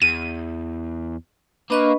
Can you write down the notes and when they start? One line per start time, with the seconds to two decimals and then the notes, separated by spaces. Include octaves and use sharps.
0.02 E2 D#7
1.70 A#3 D4 B4 D#5 C#6